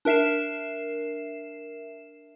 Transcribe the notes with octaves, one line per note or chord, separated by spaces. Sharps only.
D4 A#4 E5 C7 E7